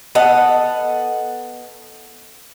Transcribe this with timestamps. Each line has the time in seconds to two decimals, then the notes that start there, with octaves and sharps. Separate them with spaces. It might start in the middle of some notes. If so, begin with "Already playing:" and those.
0.15 B3 A4 D#5 F#5